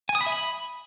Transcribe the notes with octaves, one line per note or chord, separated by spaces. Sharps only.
G#5
D#6
B5
E5
B5